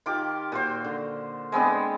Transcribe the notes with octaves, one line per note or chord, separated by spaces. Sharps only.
D#3 F4 G4 D6
A#2 F#4 C5
D3
G#3 B3 C4 D4